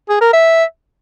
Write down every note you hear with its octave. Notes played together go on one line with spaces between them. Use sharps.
G#4
A#4
E5